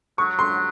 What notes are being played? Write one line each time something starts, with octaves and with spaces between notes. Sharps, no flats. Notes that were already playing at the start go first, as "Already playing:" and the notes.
F#3 C#6
C6